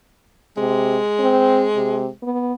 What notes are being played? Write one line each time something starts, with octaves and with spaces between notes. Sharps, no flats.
C3 G#3
C4
C3
B3